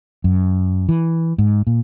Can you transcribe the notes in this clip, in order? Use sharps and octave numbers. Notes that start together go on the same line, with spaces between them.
F#2
E3
G#2
A#2